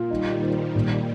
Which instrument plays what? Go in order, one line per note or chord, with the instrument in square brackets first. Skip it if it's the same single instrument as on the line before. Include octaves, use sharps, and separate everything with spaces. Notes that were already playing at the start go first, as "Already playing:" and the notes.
Already playing: [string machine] A#2 [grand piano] F4
[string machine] D#3 G3 [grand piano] D#4
[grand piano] C5
A#2